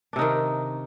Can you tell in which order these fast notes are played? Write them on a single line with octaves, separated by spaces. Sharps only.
D4 C3 D#4 D#3